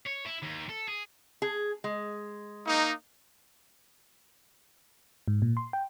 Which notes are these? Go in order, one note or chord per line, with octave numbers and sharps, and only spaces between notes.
C#5
E4
D#2
A4
G#4
G#4
G#3
A#3 D#4
G#2
A#2
C6
G5